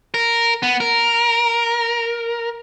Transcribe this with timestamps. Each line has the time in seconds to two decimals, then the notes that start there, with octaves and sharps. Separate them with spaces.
0.14 A#4
0.63 B3
0.80 A#4